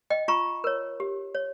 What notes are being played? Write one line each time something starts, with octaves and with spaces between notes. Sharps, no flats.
D#5 G5
F4 A#5 C#6
A#4 C#5
G4
C#5